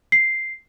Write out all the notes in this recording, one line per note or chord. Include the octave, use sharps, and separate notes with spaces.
C7